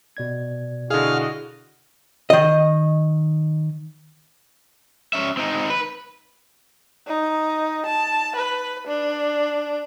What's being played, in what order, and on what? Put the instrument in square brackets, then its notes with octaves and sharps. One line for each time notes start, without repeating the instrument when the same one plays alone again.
[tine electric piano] B2 D5 G#6
[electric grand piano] D3 G#4 [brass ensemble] E4 F#4 D#5 [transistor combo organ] F5
[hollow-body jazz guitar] D#3 D#5
[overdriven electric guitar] C#4 E5
C4 D#4
B4
[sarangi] D#4
A5
B4
D4